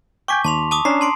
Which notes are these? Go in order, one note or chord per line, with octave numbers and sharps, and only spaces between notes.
G5 G#5 C#6 D6 G6 B6
D#2 A5 C6 F7
A5 D6 D#6
C#4 D4 A#5 C7
A5 C6 D7